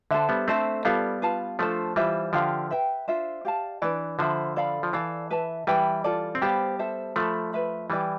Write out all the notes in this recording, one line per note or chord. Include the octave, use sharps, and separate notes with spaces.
D3 D4 A4 C5 E5
G3 B3
A3 C4 D4 A4 C5 E5
G3 B3 F4 A4 D5 F5
F4 B4 F5 A5
F3 A3 D4 F4 A4 C5
E3 G3 F4 C5 E5
D3 F3 G4 D5 F5
B4 E5 G5
D4 F4 C5 E5
G4 D5 F5 A5
E3 D4 F4 B4 D5
D3 F3 A4 C5 E5 B5
A4 D5 F5 B5
F3
E3 A4 D5 F5
B4 E5 A5
E3 G3 B4 E5 G5 B5
F4 A4 D5
C4
G3 B3 G4 C5 F5 B5
A4 C5 E5
F3 A3 A4 E5 B5
B4 E5 B5
E3 G3 E4 B4 D5 G5